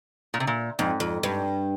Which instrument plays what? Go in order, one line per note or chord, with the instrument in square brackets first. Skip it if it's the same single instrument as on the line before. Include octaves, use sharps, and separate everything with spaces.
[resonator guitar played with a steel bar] A#2
C3
A#2
[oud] F2 [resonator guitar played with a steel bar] G#2
[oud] F2
G2